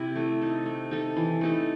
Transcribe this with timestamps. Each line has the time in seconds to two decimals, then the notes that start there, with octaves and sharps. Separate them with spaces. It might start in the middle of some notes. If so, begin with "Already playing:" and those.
Already playing: C3 E4
0.16 A3
0.42 D#4 A4
0.66 A3
0.91 D#4 A4
1.16 E3
1.41 A3 D#4 A4